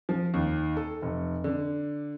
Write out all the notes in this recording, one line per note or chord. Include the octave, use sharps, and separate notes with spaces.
F3
D#2
A4
F1
D3